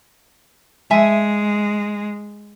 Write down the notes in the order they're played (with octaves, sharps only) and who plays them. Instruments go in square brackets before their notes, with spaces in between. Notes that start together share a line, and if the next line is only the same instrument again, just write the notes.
[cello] G#3 [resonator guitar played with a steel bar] E5 G#5